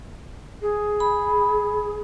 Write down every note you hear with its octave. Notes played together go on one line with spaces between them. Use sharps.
G#4
B5